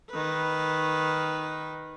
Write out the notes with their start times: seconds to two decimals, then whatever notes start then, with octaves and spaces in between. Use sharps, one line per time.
0.11 D#3 B4